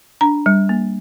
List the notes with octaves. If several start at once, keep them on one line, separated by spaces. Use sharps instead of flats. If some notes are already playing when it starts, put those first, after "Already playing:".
D4 A#5
G3
A#3